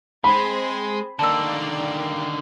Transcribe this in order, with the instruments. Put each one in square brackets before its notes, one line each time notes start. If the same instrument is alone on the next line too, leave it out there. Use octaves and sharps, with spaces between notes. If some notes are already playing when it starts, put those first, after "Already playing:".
[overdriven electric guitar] G#3 [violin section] C4 G#4 C5 [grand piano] B5
[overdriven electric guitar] D3 D#3 [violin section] A#3 D5 [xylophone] A5 E6